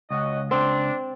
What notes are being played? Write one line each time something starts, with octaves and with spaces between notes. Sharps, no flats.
C#2 C#4 F#4 D#5
C4 D4